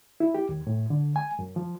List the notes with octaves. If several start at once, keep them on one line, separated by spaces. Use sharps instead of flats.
E4
G4
D#2
A2
D3
G#5
F#2
F3